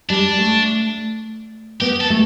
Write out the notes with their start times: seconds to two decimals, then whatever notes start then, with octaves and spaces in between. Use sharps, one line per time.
0.09 G3 D4
0.38 A3
1.81 B3 G4
2.01 A4
2.10 A3